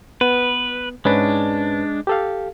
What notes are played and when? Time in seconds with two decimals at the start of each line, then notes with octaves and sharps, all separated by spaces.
0.21 B3 B4
1.05 G#2 G#3 C#4 D4 B4
2.07 G4 A4 F5